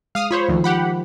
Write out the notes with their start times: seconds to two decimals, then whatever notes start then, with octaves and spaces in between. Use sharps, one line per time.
0.15 G#3 F5 D#6 F6
0.31 F4 C5 C#5 B5
0.48 D2 D#3 F3
0.64 G4 F#5 B5